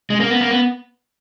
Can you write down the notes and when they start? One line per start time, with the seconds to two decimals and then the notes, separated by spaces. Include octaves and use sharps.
0.10 G#3
0.20 A#3
0.30 B3
0.41 A#3
0.51 B3